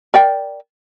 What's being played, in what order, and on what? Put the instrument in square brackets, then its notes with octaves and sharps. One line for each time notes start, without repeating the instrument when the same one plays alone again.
[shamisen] A#4 D5 G5